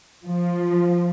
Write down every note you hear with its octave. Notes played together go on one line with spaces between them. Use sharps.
F3